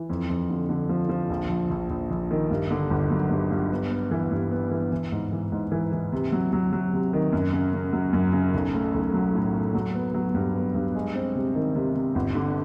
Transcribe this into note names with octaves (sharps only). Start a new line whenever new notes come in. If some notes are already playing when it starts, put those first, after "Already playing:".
Already playing: E3
F2
F2
D3
D3
F3
F3
A#1
A#1
A#1
A#1
A#1
D#3
G2
D3
G1
F#3
G2
G2
B3
B3
E3
G2
B3
E3
E3
G#2
E3
G#2
E3
E3
C3
F#3
F#3
F#3
C3
D#3
F#2
C#3
C#3
F#3
F#2
C#3
B1
A3
B1
F#3
A2
A3
F#3
B3
F#3
G2
B3
G2
G#3
C4
C3
D#3
C3
C3
G1
D3